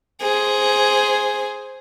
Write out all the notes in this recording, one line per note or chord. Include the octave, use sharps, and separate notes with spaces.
G#4 C5